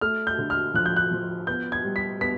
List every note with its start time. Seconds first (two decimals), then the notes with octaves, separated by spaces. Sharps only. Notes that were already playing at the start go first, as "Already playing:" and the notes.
0.01 A3 F6
0.27 G6
0.38 D3
0.50 F6
0.74 F3 F#6
0.86 G6
0.96 F#6
1.11 F3
1.47 B3 G6
1.72 G#6
1.85 G3
1.96 B6
2.21 B3 B6